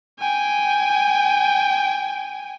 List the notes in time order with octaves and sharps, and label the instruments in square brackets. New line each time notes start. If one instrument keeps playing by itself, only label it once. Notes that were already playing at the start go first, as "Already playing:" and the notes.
[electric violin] G5 G#5